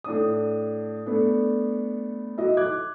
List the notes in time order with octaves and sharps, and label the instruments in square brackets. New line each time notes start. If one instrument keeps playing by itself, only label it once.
[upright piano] A2 D4 D#6
A3 B3 D4
E4 F#4 D#5
D6 F#6 G#6